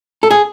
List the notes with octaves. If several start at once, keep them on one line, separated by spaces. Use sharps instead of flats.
A4
G#4